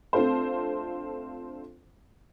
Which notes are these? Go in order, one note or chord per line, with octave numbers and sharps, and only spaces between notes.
A3 C4 D4 F4 A4 C5